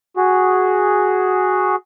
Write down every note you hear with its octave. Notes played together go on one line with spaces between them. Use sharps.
F#4 G#4